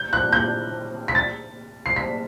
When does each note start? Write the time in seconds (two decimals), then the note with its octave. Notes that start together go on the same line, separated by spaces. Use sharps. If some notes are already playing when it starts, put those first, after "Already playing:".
Already playing: G6
0.13 F#6
0.33 G6
1.08 B6
1.15 A6
1.86 C7
1.96 B6